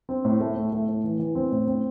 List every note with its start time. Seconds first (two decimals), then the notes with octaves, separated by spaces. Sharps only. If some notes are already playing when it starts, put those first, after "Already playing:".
0.09 C4
0.24 A2
0.40 A3
0.56 A2
0.72 A3
0.88 A2
1.04 E3
1.19 E3
1.35 C4
1.51 A2
1.67 C4